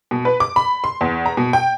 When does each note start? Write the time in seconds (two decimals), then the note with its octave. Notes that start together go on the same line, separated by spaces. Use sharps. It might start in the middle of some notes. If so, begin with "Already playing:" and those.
0.11 B2
0.25 B4
0.40 D6
0.56 B5
0.84 C6
1.01 E2
1.26 A#5
1.37 B2
1.53 G5